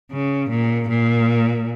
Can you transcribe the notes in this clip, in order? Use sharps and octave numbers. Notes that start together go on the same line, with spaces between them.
C#3
A#2
A#2